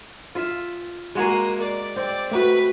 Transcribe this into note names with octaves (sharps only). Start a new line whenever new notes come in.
F4 E5
G#3 A#3 F#4 G#4 A#4
D5
C4 D5
A3 F#4 B4